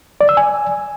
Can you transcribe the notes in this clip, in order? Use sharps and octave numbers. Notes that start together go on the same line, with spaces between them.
D5
E6
G#5